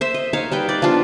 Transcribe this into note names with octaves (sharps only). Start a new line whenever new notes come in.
C5 E5
D#5
D#4 C#5 F5
G3 B4 G5
D5
F3 B3 D4 F4